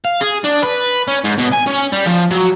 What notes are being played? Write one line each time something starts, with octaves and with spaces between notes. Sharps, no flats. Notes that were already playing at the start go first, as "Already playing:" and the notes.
F5
G#4
D4
B4
C#4
G#2
B2
G#5
C#4
G3
F3
F#3